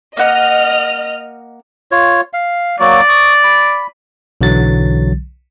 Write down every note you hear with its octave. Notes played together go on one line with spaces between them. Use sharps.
A#3 D#5 F#5 F6
F4 C#5
F5
F#3 A#3 F#4 D5
C#6 D#6
B5
B1 D3 E3 F#3 A6